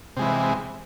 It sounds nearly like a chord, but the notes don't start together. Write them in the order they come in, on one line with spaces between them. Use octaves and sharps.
C3 G#3 E3